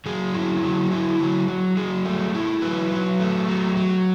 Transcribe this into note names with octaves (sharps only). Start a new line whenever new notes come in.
F#3 G#4
E4
F#3
E4
F#3
F#3
F#3 G#4
A3
E4
F#3 B4
F#3
A3
F#3
F#3